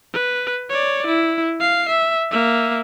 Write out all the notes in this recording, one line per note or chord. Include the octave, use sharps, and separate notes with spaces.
B4
C#5 D5
E4
F5 C7
E5
A#3 E5